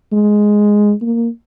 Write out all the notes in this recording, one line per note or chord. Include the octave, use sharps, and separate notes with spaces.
G#3
A#3